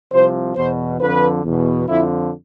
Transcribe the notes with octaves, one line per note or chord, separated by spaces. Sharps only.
C2 C3 F3 C5
E2 B2 C5
F2 D3 F3 B4
E2 B2
F2 D3 F3 E4